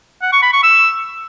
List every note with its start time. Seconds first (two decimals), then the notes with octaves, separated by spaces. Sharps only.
0.22 F#5
0.32 C#6
0.43 B5
0.53 C#6
0.63 E6